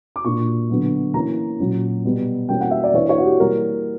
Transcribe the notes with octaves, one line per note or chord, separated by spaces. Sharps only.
D6
A#2 A#3 D4 C#6
D3 F#3 B3 D4
E3 A#3 C#4 A#5
A#2 F#3 C#4
B2 G3 B3
E3 G3 A#3 C#4 G5
F#5
E5
D5
E3 A#3 D4 C#5
C#5
F#4
G4
E3 G3 A#3 A#4